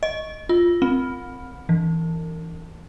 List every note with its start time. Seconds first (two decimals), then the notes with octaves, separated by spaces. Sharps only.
0.03 D#5
0.49 F4
0.82 C4
1.69 E3